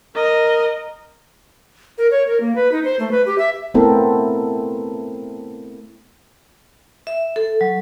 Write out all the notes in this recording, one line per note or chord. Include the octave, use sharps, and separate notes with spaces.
A#4 D#5
A#4
C#5
A#4
A#3
B4
D#4
C5
A3
B4
G4
E5
A3 B3 C4 E4 A4 A#4
E5
A4
F#3